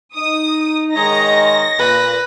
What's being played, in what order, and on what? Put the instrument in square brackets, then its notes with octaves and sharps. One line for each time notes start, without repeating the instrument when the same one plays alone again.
[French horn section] D#4 [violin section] D#6
[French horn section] D#3 G#3 [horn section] C#5 D#5 [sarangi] A#5 [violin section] A#6
[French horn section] A#2 [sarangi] B4